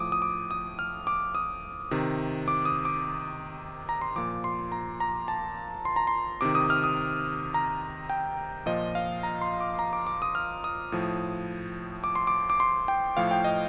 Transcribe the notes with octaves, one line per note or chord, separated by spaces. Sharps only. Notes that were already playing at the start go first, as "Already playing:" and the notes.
Already playing: A2 F3 D6 D#6
D#6
D6
D#6
F6
D6
D#6
C3 D#3
D6
D#6
D6
A#5
C6
A#2 F3 D6
C6
A#5
A#5
A5
C6
A#5
C6
C3 D#3 D6
D#6
F6
D#6
A#5
G5
A#2 F3 D#5
F5
A#5
C6
D6
A#5
D6
D6
D#6
F6
D#6
A2 F3
D6
C6
D6
D6
C6
G5
A2 F3 F5
G5
D#5